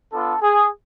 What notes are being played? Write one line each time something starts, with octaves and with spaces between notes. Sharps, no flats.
B3 D4 F4 A4
G#4